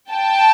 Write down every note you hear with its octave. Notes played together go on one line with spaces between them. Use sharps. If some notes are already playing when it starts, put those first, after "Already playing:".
G5 A5